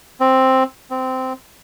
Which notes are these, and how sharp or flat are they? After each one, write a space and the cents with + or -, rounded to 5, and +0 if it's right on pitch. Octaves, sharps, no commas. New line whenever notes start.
C4 +5
C4 -15